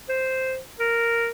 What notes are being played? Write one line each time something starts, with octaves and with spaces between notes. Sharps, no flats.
C5
A#4